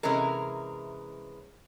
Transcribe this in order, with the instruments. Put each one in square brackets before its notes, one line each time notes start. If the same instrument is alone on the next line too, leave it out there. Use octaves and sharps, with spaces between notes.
[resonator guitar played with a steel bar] C3 E3 G#3 C#4 A#4